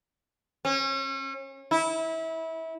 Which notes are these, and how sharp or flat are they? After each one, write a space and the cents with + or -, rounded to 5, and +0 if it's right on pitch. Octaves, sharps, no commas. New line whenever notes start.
C#4 -35
E4 -25